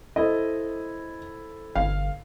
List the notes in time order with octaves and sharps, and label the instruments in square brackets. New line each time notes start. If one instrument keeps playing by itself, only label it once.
[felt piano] E4 A4 C5 [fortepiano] D#5
[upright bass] G1 [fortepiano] F5